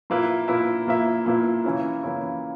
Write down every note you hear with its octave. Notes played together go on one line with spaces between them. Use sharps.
A#2 A#3 E4 B4 E5
A#2 A#3 E4 B4 E5
A#2 A#3 E4 B4 E5
A#2 A#3 E4 B4 E5
C#3 E3 A#3 C#4 E4
C#3 E3 A#3 C#4 E4